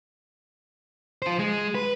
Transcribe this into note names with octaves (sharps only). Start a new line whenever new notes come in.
F4 C5
G#3
B4